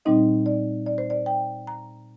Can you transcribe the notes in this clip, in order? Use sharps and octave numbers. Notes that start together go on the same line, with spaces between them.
A#2 G3 C4 D#4 D#5
D5
D5
C5
D5
G5
A#5